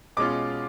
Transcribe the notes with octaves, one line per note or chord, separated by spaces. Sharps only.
B2 G#3 C#4 F4 D6